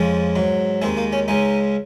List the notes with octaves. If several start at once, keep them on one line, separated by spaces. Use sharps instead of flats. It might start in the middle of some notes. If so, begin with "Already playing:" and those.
Already playing: F2 C#3 F3 G#3
G#2 F#3
D#2 D#3 G#3 C4
A#3
C#4
C#2 C#3 G#3 D#4